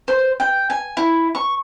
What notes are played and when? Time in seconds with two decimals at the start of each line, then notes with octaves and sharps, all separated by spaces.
0.08 C5
0.40 G5
0.70 G#5
0.97 E4
1.35 C#6